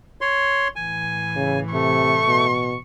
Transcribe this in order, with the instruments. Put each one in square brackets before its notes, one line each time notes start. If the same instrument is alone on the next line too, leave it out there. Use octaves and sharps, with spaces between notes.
[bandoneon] C#5 C6
[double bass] A2 E3 [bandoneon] G#5
[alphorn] C#3
[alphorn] C3 [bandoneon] A3 [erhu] C#6
[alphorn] B2